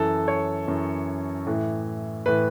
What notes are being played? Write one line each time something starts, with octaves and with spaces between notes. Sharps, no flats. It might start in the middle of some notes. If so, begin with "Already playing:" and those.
Already playing: F#2 E3 A4
C#5
F#2 E3
A2 E3
A2 E3 B4